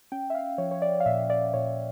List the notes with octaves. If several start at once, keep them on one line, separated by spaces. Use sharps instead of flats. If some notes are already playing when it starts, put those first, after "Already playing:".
C#4 G5
E5
F5
F3 C#5
C#5
D5
F5
A#2 E5
D5
D5
A#2 C#5